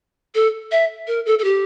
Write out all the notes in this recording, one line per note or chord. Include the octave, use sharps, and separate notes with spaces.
A4
E5
A#4
A4
A4
G4